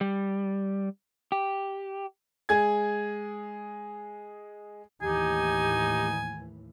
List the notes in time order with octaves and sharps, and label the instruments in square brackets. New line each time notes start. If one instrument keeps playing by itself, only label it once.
[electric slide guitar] G3
G4
[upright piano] G#3 G#4 G#6
[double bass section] D#2 A2 E3 [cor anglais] D#4 [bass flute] G4 [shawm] G#5